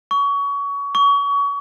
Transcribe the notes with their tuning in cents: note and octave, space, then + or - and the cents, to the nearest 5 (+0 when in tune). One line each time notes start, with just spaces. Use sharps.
C#6 +25
C#6 +30